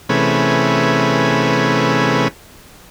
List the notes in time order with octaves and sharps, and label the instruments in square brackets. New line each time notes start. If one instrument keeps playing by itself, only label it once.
[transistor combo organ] C3 E3 A3 C#4 G#4 B4